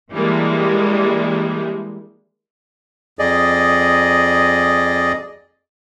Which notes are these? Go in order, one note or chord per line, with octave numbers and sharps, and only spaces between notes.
E3 G3 G#3 A#3 D4
F2 G#4 D5 D#5